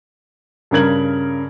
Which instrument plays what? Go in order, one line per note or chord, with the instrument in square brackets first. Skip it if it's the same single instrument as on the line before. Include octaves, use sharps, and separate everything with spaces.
[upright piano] G2 C#3 A#4 G#6 F#7